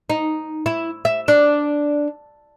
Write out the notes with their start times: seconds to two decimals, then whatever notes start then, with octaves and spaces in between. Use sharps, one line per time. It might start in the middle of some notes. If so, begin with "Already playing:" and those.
0.10 D#4
0.66 E4
1.05 E5
1.28 D4